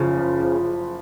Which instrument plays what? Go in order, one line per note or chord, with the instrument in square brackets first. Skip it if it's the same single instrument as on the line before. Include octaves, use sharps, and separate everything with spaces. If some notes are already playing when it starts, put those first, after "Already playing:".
Already playing: [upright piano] F#1 F3 [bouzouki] C#3
[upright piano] F3
F3